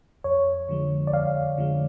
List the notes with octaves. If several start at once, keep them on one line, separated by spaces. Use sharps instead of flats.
F2 C#5
D3 F3 G#3
D5
F2 F5
D3 F3 G#3